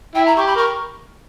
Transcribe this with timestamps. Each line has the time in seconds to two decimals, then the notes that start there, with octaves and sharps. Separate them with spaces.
0.15 E4 G5
0.26 A#5
0.36 G4 C#6
0.47 B5
0.56 A#4 C#6